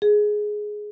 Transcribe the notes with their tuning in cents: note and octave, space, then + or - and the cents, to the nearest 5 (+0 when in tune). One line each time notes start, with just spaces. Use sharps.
G#4 +10